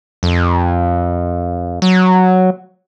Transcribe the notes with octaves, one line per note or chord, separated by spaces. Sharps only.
F2
F#3